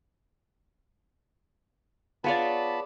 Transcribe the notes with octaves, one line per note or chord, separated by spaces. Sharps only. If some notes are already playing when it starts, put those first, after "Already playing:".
B3 F4 G#4 C#5 D5 A5 B5